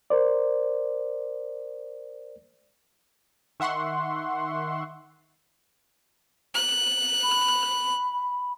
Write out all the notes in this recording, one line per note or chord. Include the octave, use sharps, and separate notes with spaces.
A#4 C5 D5
D#3 E5 F#5 C6 C#6
F#6
B5